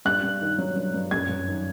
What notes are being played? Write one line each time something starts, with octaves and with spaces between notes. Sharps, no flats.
G2 F#6
G2
D#3
F#3
G2
G2
F#2 G#6
F#2
D#3